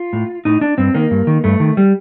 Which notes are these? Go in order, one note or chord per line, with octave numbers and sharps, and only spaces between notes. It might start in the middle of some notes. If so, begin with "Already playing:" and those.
Already playing: F4
A2
A2 D#4
D4
G2 C4
D#3 A#3
G2
D#3
G2 A3
D#3
G3